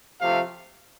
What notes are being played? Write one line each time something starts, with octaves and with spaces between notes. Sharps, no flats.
C3 F3 A3 F5